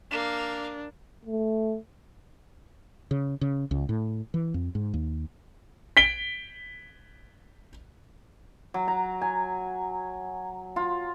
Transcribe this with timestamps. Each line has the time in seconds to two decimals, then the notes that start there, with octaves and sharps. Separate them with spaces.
0.11 A#3 D4 F5
1.26 A3
3.11 C#3
3.41 C#3
3.71 C#2
3.89 A2
4.34 E3
4.54 F2
4.75 G#2
4.94 D#2
5.97 B6 D7 G7
8.74 F#3
8.88 A#5
9.22 G#5
10.76 F4